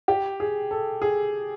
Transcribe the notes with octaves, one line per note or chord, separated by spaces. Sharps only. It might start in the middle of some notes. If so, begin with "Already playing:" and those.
G4
G#4
A4
G#4